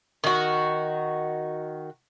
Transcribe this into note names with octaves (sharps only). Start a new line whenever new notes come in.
D#3 F#4